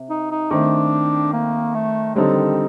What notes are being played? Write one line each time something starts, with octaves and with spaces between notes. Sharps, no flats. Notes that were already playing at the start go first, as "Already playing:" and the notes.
Already playing: C3
D#4
D#4
D#3 A3 C4 D4
A#3
A3
D3 F#3 G3 C4 D#4 A4
D#3